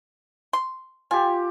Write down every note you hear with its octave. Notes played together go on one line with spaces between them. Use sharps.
C6
F4 G4 G#5